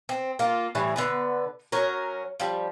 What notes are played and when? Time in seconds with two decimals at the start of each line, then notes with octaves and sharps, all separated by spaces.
0.09 C4
0.39 A#3 F4
0.75 A2 E3 G3
0.96 D3 B3 B4
1.72 F#3 C#4 A#4
2.40 F3 G3